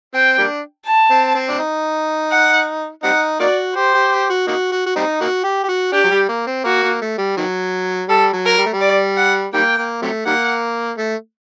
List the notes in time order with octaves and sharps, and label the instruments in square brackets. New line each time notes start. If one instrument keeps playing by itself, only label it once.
[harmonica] C4 [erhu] G5
[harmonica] G3 A#3 D4
[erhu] A5
[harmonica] C4
C4
D4
D#4
[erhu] F#5
[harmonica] G3 C4 D#4 [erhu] F#5
[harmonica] A#3 D#4 F#4 [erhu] D5
[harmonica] G4 [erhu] C5
[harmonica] G4
G4
F#4
A#3 D#4 F#4
F#4
F#4
G3 C4 D#4
A#3 D#4 F#4
G4
G4
F#4
[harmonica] D4 [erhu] G4
[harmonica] F#3
G3
A#3
C4
[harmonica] A#3 [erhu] F#4
[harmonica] A#3
A3
G3
D#3 F#3
[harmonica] G3 [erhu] A4
[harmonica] F#3
[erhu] A#4
[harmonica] G3
A3
G3
[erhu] D5
F#5
[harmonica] D#3 G3 A#3 [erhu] G5
[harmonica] A#3
C3 F#3 A3
[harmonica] D#3 G3 A#3 [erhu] F#5
[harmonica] A3